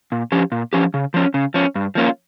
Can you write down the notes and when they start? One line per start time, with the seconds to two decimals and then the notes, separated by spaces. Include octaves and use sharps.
0.12 A#2
0.32 F3 C#4 G4
0.52 A#2
0.73 F3 C#4 G4
0.94 C#3
1.14 F3 C#4
1.34 C#3
1.54 F3 C#4
1.75 G2
1.95 F3 A#3 C#4 F4